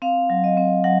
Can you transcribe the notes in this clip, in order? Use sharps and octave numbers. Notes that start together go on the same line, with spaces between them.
C4 F5
F#3
D#5
C4
F#3 F#5